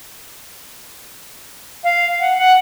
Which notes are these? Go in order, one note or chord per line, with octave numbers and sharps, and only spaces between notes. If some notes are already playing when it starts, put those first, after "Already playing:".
F5
F#5
F#5